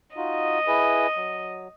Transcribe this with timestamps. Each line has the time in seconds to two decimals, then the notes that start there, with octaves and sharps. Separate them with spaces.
0.17 D#4 F4 F#4 D#5
0.67 E4 G#4 B4
1.17 F#3